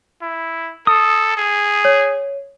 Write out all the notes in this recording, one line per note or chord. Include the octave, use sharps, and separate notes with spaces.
E4
A4 D#6
G#4
C#5